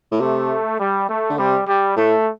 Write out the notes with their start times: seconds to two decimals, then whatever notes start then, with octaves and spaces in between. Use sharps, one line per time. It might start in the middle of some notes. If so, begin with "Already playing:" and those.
0.12 A2
0.19 C3 A3
0.79 G3
1.08 A3
1.30 D3
1.37 C3 G3
1.67 G3
1.96 A2 A3